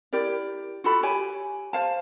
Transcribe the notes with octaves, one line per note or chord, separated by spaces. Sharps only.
E4 G4 A#4 D5
F4 F#4 A4 B5
G4 C#5 G#5
C5 F5 G#5 A5